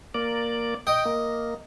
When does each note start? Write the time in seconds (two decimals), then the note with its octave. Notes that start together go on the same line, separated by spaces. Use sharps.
0.14 A#3 D5
0.87 D#5 G5
1.05 A#3